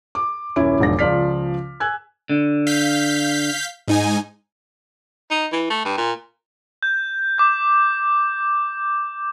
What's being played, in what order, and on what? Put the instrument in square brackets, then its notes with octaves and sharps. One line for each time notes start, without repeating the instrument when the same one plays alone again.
[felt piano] D6
D#1 F#2 C#4 E4 C#5 D7
E1 G#2 F3 D4 A#6
C#2 F3 F4 D5 F6 B6
G#5 E6 F#6 G#6
[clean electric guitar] D3
[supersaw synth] F5 G6 B6
G#2 D#4 G#5
[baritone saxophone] D#4
E3
A3
G2
A#2
[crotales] G6
D6 G6